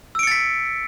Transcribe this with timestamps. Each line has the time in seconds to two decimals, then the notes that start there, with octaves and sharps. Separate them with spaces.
0.15 E6
0.19 D7
0.23 C#7
0.27 A6
0.31 B6